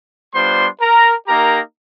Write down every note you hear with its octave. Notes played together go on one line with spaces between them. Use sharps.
G3 B3 D4 F4 C5 C6
A#4 A#5
A#3 D#4 G4 A#4 A#5